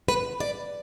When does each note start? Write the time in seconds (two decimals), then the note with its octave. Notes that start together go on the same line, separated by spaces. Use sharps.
0.08 B4
0.40 D5